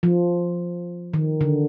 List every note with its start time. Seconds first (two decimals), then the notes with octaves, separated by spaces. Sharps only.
0.03 F3
1.14 D#3
1.41 D3